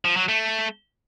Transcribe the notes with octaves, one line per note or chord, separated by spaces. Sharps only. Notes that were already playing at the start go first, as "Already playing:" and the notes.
F3
F#3
A3